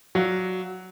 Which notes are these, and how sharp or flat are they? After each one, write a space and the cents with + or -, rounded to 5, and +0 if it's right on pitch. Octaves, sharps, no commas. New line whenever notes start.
F#3 +0 D5 +0 F5 +0